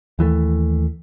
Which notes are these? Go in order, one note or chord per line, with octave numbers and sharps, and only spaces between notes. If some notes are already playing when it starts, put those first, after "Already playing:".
D#2 E3 F#3 A3